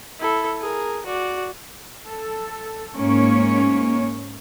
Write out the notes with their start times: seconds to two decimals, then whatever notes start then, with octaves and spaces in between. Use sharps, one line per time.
0.20 E4 A4
0.60 G#4 A#4
1.06 F#4 D5
2.06 A4
2.96 G#2 A#3 C#4 C#5